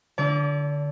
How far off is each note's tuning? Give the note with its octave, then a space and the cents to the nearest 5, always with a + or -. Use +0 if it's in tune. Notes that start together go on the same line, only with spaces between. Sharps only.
D3 +0 D5 -35